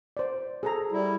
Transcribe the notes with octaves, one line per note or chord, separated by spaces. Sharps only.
C5 D5
G#4 A4 A#5
G3 E4